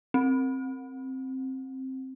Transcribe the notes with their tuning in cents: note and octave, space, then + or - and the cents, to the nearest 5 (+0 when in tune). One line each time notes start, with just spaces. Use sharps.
C4 +10